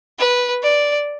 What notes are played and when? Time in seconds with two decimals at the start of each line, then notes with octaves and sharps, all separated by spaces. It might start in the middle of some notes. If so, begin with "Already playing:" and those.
0.19 B4
0.63 D5